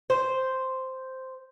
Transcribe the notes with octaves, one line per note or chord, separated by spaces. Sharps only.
C5